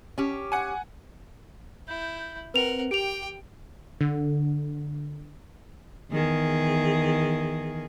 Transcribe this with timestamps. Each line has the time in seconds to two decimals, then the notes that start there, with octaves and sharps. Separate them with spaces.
0.18 C#4 G4
0.52 F#5 G#5
1.88 E4 G6
2.54 C4 A#4 B4 F#5 F7
2.91 G4 G5 D7 F7
4.01 D3
6.12 E2 D#3 G#4